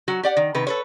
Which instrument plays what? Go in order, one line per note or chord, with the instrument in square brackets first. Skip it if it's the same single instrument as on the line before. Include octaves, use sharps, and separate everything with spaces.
[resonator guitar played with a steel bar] F#3 F#4
G4 D5 F#5
D#3
C3 D#3 B4
A4 B4 C#5